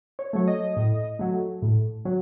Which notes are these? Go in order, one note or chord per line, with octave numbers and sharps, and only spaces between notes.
C#5
F#3 A3 C#5
D#5
A2
F#3 A3
A2
F#3